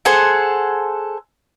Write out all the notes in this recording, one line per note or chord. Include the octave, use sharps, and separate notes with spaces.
G#4 A4 C5 F#5